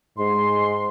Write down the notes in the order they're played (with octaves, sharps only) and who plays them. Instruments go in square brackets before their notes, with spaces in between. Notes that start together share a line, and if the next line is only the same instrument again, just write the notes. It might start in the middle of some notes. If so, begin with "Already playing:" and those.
[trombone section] G#2 [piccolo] C6